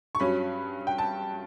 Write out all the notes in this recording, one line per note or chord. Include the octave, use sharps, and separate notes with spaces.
C#6
G2 F#3 C#4 B5
G5
A5